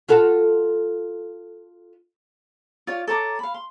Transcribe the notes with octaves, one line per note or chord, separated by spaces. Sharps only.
F4 F#4 A4
F4 C#5 D5
A4 C#5 A#5 D6
F5 B5
C6